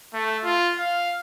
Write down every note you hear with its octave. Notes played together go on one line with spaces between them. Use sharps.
A3
F4
F5